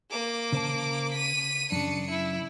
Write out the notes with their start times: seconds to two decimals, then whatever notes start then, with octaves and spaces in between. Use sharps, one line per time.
0.10 A#3 D6
0.52 C#3 C5 A5
1.13 B6 D#7
1.72 F#2 C#3 D4 C#7
2.10 E4